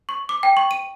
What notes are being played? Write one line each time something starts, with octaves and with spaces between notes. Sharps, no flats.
C#6
D6
G5
C#6
D#7